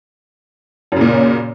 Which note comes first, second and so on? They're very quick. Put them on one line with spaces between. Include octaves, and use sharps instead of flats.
F#2 C#3 A#2